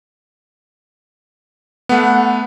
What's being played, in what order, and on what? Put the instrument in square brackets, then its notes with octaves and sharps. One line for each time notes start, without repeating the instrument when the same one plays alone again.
[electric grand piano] A3 B3 [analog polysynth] F#5